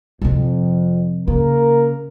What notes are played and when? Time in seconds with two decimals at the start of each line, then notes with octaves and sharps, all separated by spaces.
0.22 F2 C3 F3
1.28 C#3 A#3 A#4